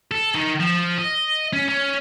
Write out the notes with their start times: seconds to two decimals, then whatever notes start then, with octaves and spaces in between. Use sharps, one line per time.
0.11 A4
0.35 D#3
0.60 F3
0.98 D#5
1.53 C#4
1.69 C#4